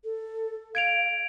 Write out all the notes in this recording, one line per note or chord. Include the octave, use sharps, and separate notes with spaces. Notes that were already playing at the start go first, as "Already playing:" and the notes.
A4
F5 G#6 D7 F7